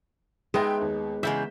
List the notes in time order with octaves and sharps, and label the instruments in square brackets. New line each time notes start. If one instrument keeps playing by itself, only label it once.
[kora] G#3 B3 D#4 [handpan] G#4 B4 [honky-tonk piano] E5 G5 C6
[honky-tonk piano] D#2
[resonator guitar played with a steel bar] E2 C#3 G#3 [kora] E5 [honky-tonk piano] G6